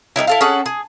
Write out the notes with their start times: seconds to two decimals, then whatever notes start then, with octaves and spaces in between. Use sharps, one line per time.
0.16 G3 B3 D#4 E4
0.27 E4 A4 F5
0.41 C#4 G#4 A4 F#5
0.66 G#4